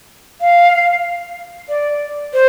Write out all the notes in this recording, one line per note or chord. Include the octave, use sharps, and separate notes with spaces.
F5
D5
C5